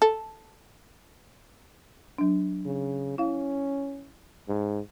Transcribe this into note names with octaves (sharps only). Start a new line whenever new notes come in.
A4
F#3 D4
C#3
C#4 E4 F5
G#2